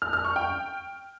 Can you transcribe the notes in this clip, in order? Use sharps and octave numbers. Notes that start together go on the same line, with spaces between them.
F6
F6
C#6
G5